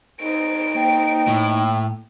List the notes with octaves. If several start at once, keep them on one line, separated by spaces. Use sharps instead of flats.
D#4 D7
A#3 G5
A2